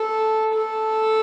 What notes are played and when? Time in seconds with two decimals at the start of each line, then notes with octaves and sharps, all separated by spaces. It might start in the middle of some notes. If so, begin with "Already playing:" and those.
Already playing: A4
0.53 A4